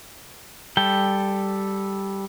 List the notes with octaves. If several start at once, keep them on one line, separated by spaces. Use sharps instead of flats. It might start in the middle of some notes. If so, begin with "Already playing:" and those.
G3 A4 G5